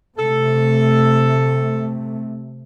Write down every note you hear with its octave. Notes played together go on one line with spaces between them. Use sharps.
C3 A3 A4